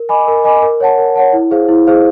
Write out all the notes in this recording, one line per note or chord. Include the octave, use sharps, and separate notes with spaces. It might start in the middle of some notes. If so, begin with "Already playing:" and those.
Already playing: A#4
D#5 G#5 B5 D6
A#4
D#5 G#5 B5 D6
A#4
C#5 F#5 A5
A#4
C#5 F#5 A5
E4
G#4 C5 F5
E4
G#4 C5 F5